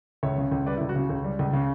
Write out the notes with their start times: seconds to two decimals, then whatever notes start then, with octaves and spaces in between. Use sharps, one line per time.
0.23 C#2 C#5 E5
0.38 C#3
0.52 C#2
0.67 G3 B4 D5
0.77 E4
0.81 C#2
0.89 F#4
0.96 C#3
1.10 C#2
1.24 G3
1.39 C#2
1.53 C#3